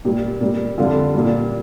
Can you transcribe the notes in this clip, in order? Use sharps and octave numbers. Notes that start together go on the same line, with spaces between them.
A#2 G3 G4
A#2 G3
F2 D3 G3 F4
A#2 G3